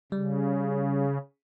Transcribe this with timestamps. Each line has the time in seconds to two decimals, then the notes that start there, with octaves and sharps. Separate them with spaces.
0.12 C#3 G3